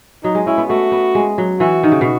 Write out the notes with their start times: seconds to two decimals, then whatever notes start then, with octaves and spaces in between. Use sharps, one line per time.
0.24 F#3 D#4
0.35 G#3
0.47 C#4 E4
0.58 B3
0.69 A3 F#4
0.92 B3
1.15 G#3
1.38 F#3
1.60 E3 F#4
1.83 D#3
1.92 C#3
2.01 B2